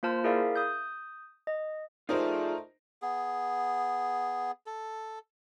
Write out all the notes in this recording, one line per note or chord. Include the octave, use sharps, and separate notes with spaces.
A#3 F4 C5 A5 F6
E4 G#4 A#4 D5 E5 F5
D#6 G6
D#5
A3 D#4 F4 G#4 A#4 C5 D5
B3 G#4
A4